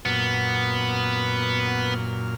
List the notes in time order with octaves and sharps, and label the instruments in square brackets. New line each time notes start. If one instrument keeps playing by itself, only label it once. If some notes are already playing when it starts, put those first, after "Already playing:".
[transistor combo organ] F#2 A#2 F6 [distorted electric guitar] B3